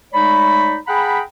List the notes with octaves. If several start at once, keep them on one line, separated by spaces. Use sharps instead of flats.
G#3 A3 D#4 C#5 D5 B5
G#4 F#5 G5 A#5 B5